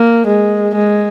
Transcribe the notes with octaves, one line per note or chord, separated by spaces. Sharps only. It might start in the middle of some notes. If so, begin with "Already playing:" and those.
Already playing: A#3
G#3
G#3